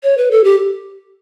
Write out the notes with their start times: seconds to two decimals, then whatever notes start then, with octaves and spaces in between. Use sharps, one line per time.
0.03 C#5
0.18 B4
0.31 A4
0.44 G4